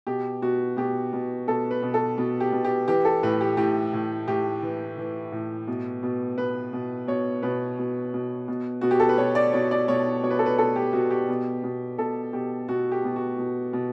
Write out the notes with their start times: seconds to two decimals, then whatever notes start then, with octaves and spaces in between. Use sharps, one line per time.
0.07 B2 G4
0.42 B2 F#4
0.77 B2 G4
1.13 B2
1.48 B2 A4
1.71 B4
1.82 B2
1.94 A4
2.18 B2
2.40 G4
2.52 B2
2.64 G4
2.88 E3 G4
3.05 A4
3.23 A2 B4
3.41 G4
3.57 A2 G4
3.93 A2
4.28 A2 G4
4.62 E3
4.97 E3
5.32 A2
5.67 B2
6.03 B2
6.38 B2 B4
6.73 B2
7.07 B2 C#5
7.42 B2 B4
7.79 B2
8.14 B2
8.48 B2
8.81 B2 F#4
8.91 G4
9.00 A4
9.09 B4
9.18 B2 C#5
9.35 D5
9.53 B2 C#5
9.71 D5
9.88 B2 C#5
10.23 B2 C#5
10.30 B4
10.39 A4
10.46 B4
10.58 B2 A4
10.76 G4
10.93 B2 F#4
11.10 G4
11.29 B2
11.64 B2
11.98 B2 A4
12.33 B2 G4
12.68 B2 F#4
12.92 G4
13.04 B2
13.16 F#4
13.38 B2
13.73 B2